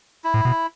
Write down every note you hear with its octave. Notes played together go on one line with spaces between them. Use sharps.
E4
A2
B2